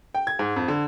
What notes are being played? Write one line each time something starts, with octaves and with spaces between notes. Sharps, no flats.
G5
G#6
G#2
F2
D3